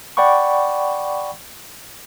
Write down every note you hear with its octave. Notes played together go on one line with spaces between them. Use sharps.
D5 F#5 G5 B5 C#6